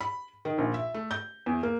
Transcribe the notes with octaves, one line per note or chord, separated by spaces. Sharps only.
B5
D#3
A#1
E5
A3
G6
E2
A#3